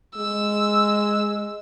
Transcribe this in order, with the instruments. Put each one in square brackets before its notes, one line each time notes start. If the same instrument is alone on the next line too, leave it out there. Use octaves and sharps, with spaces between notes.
[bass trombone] G#3 [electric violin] E6